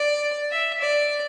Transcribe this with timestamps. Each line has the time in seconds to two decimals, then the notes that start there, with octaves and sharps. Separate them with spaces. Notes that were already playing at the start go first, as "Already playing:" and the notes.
Already playing: D5
0.52 E5
0.81 D5